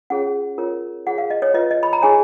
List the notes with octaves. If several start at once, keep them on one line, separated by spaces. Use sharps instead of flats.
C#4 F4 G#4 C#5 F#5
F4 A#4 C#5
F4 G#4 C#5 F#5
F5
D#5
C#5
F4 B4 D#5
D#5
B5
A#5
D#4 G#4 C#5 G#5